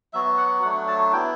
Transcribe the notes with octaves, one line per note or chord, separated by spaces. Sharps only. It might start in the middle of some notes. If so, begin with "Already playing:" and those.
F#3 B3 F#4 E5
F#5
F#3 A3 D4 F#5
A5
B3 E4 G5